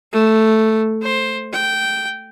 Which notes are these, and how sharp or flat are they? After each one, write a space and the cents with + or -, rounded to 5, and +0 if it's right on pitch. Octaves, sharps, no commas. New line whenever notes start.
A3 +0
C5 +10
G5 -10